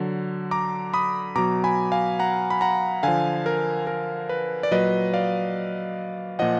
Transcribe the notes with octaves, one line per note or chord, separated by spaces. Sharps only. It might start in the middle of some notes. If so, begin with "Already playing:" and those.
Already playing: D3 F#3
A#5 D6
B5 D#6
B2 F#3 A#5 D6
G#5 B5
F5 G#5
F#5 A#5
B5
F#5 A#5
D3 F3 F5 G#5
A#4
A#4
B4
D5
A#2 F#3 B4 D#5
D5 F5
A#2 F3 D#5 F#5